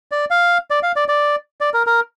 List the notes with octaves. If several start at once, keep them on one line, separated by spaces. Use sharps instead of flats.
D5
F5
D5
F5
D5
D5
D5
A#4
A#4